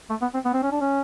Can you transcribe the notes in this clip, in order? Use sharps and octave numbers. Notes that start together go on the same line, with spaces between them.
A3
B3
C4
B3
C4
C#4
D4
C#4